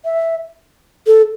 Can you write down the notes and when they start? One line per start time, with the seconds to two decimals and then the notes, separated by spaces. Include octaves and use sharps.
0.05 E5
1.07 A4